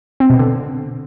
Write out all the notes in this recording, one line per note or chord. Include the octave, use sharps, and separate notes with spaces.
C4
B2
D3